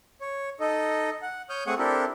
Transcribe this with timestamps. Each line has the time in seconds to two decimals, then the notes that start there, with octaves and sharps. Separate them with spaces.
0.21 C#5
0.60 D#4 A4 D#5
1.22 F#5
1.50 C#5 D#6 F6 G6
1.67 A3 C4 G#4 F#5 C#6 D#6
1.78 C4 D4 E4 G4 A4 A#4